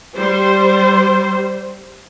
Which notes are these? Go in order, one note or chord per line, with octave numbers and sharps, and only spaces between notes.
G3 C5